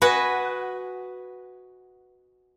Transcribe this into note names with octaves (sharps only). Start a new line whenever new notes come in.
F#4 B4 D#5 F#5 G#5